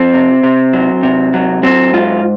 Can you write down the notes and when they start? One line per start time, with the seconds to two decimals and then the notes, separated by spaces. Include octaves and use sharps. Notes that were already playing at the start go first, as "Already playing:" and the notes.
Already playing: F3 C4
0.14 C3
0.43 C3
0.73 F#3
1.03 C3
1.34 F#3
1.63 F#3 C4
1.93 G#2 F4